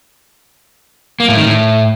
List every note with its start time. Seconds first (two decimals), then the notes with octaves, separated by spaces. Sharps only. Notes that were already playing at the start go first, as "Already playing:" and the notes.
1.20 A#3
1.29 A2
1.37 D#3
1.46 A2